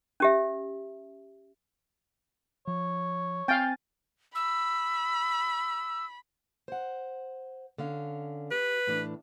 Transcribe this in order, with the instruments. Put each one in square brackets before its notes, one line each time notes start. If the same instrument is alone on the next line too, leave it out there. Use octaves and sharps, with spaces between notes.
[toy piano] C#4 G4 E5
[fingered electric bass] F3 [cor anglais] C#5
[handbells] C4 G#5 A6 [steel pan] F5 G5
[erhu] B5 [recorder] E6
[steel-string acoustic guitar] C5 F#5
D3 C#4 F5
[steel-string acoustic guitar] G4 [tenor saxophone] B4
[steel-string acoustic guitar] A2 E3 D4